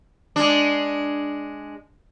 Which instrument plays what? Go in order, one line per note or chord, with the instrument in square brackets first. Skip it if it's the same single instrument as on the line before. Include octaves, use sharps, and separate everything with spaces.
[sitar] G#3 D4